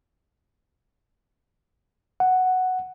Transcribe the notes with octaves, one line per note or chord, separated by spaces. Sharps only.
F#5